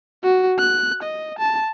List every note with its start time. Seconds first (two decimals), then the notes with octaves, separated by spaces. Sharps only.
0.23 F#4
0.59 F#6
1.03 D#5
1.39 A5